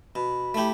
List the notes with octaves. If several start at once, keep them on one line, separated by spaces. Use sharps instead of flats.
B2 B5
A3 E4 G4